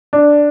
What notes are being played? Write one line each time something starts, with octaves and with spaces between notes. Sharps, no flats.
D4